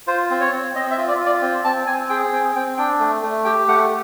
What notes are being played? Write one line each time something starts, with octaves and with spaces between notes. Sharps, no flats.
F4 C5
C4
C#5
C4
C4 D#5
E5
F4
D5
F4
D5
C4
C4 A5
C4 G#5
G#4 G5
C4 G5
C4 G5
D4 G5
A3
A3
G4 G5
A3 F#5